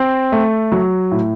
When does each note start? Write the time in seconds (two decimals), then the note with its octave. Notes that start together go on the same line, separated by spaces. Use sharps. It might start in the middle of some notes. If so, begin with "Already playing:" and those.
Already playing: C4
0.32 A3
0.72 F#3
1.11 A2